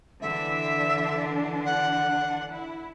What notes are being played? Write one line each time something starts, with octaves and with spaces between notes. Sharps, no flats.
D3 E3 D4 E5
F#5
E4